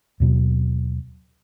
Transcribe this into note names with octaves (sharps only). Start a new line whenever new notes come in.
D#2 B2 F#3